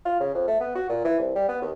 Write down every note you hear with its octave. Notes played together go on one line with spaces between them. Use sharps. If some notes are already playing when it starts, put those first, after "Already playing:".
F4
C#3
F2
A3
B3
F#4
A#2
E3
C2
G3
B3
D#2